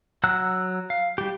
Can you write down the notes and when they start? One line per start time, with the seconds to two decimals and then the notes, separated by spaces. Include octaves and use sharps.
0.24 F#3 F#5 A#5 E6 F#6
0.90 F5
1.18 G3 G4